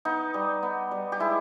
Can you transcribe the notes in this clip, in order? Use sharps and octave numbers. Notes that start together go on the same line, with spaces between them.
B3 D#4
G3
B3
G3
G4
G#3 E4